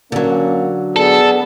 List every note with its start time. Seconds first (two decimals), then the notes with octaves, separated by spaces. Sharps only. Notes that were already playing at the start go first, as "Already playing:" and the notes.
0.12 D3 F#3 A#3 C#4
0.96 B3 G#4 A4 D5